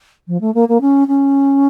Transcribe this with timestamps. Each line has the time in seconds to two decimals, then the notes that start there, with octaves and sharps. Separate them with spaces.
0.28 F3
0.41 A3
0.54 A#3
0.68 A#3
0.81 C#4
1.08 C#4